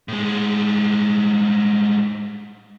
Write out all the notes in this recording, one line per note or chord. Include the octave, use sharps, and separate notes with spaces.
A2 G#3